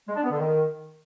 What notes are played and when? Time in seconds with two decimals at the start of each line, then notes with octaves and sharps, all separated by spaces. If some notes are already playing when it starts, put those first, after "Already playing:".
0.08 G#3
0.16 D4
0.24 B3
0.31 D3
0.39 D#3